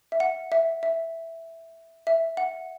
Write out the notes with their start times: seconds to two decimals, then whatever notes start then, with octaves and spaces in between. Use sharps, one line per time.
0.12 E5
0.20 F#5
0.52 E5
0.83 E5
2.07 E5
2.37 F#5